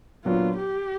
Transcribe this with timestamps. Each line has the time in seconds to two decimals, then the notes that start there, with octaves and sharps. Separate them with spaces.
0.25 A#2 F#3 B3 D4 F4
0.58 G4